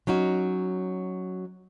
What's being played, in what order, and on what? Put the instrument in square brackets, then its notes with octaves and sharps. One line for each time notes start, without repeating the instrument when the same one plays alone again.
[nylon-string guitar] F#3 C#4 D#4 F#4